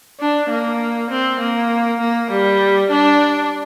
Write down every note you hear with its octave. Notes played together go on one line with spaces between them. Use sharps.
D4
A#3
C4
A#3
A#3
G3
D4